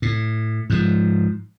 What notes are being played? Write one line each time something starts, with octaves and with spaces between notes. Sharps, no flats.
A2
G#2 F3